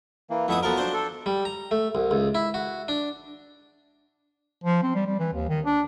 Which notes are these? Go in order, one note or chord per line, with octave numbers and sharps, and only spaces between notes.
E3 A#3
F2 A3 B3 E4 E5 D#6
F3 F#3 B3 A4 A#4
D4 C5
A4
G3
A#5
A3
C2
C#2
E4
F#4
D4
F3
C4
G3
G3
E3
D#2
D#3
D4